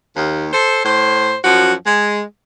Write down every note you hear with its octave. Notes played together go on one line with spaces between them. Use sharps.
D#2
A4 C5
A2 C5
F#2 F3 F#4
G#3